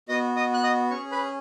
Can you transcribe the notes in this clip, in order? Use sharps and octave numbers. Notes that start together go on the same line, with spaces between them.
B3 F#4 D#5 D#6
D#5 D#6
F#6
D#5 D#6
C#4 G#4 C#5 C#6
B4 B5